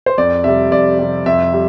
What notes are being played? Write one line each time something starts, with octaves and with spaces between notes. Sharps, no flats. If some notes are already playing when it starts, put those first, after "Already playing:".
C5
F2 D5
C3 G3 E5
F2 D5
C3 G3
F2 E5
G3